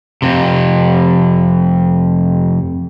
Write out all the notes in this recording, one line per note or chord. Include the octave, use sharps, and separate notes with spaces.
F2 C3